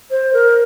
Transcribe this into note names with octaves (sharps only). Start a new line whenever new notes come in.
C5
A#4